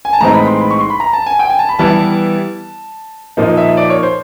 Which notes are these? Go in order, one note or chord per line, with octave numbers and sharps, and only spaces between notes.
G#5
A5
A2 E3 G#3 C4 D#4 A#5
B5
C6
B5
C#6
C6
B5
A#5
A5
G#5
G5
G#5
A5
B5
E3 G3 B3 E4 A5
A#2 F3 A#3 D#4
E5
D5
C#5
C5